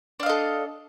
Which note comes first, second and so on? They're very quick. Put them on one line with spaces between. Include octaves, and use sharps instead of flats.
D4 F5 D#5 A4